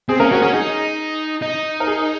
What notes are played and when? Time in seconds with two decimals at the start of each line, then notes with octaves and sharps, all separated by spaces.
0.09 C4 G#4
0.20 A#3 C#4 A#4
0.31 C#4 F#4
0.42 C#4 G#4
0.53 D#4 G#4
1.42 D#4
1.80 A#4
1.87 G#4